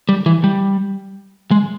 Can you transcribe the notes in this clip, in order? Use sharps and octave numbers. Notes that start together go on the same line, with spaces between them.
G3
E3
G3
G#3